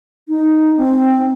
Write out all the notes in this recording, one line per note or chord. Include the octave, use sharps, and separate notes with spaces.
D#4
C4